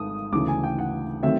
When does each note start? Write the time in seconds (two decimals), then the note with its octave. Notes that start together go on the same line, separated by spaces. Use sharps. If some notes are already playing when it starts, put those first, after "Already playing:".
Already playing: G#1 G#2 A3 D#6
0.32 D2 C#3 E3 D6
0.48 G#5
0.64 G5
0.79 F#5
1.23 D#3 F#3 A3 C4 E5